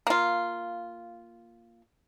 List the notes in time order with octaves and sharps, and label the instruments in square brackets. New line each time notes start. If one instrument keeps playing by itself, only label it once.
[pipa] A#3 F4